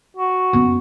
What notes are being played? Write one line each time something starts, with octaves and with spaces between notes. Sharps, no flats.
F#4
F#2 B3